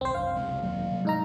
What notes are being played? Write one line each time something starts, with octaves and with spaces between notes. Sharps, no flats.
D#1 B1 C4 C5
C2 F#2 D4 F5
C#2 C3 G#3
E1 D#3 F#3 A#3
C3 G3
G#2 D#4 A#5